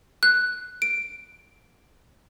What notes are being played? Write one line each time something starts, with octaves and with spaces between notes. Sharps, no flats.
F#6
D7